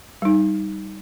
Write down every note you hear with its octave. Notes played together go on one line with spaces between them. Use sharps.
G3 D#4